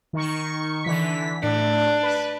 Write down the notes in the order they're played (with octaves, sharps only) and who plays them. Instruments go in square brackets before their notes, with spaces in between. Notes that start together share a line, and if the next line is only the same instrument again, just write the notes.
[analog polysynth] D#3 C#6
D3 E3 B6
[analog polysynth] A2 [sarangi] D4
[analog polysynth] B4